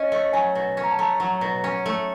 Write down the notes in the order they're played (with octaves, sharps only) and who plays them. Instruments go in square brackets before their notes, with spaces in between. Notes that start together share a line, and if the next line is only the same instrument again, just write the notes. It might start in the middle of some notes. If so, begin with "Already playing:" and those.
Already playing: [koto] C#4 [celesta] D#5
[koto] A3
[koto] F#3 [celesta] G#5
[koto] B2
C#4
[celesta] A#5
A5
[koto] A3 [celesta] A#5
[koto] F#3
B2
C#4
A3